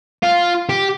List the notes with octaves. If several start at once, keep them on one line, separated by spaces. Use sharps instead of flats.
F4
G4